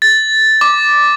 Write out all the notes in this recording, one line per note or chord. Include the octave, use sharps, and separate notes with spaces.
A6
D6